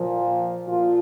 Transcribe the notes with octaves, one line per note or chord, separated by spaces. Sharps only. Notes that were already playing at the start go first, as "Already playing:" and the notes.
Already playing: A#2 F3
A#2 F3 F4